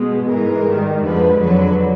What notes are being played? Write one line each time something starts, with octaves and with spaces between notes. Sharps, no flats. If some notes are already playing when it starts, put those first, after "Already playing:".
Already playing: B2 G#3
G#2 E3 G#3 A#4
G#2 D#3 G3
F2 D3 F3 G#3 B4
F2 D3 F#3 B4